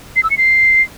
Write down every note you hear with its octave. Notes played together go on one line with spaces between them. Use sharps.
C7
E6
C#7
C7